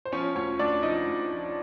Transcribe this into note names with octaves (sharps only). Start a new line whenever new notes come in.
C5
F3 C#4 C#5
D2 C#4 C#5
D2 D4 D5
F3 D#4 D#5
D2
F3